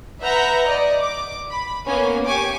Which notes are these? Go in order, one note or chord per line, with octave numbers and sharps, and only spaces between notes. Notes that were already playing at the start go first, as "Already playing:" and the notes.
B4 E5 F#5 A#5 G6
D5 D#5
D6
B5
A#3 B3 C#4 G#5
G4 G#5 C#6 D6